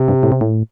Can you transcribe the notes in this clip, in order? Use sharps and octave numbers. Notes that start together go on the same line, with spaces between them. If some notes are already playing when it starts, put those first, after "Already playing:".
Already playing: C3
G2
A2
C3
A2